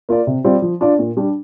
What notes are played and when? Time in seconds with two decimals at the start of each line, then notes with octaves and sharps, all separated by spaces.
0.09 A#3 F4 D5
0.27 C3
0.44 G3 C4 F4 D5
0.62 F3
0.81 D4 F4 D5
0.99 A#2
1.17 G3 D4